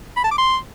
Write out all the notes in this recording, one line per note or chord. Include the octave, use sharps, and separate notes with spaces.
B5
A5
D6
C6